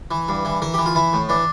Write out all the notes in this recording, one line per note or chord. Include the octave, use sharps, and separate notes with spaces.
E3
G2
E3
E3 A#4
E3 G4
F4
E3 E4
A2
E3 D4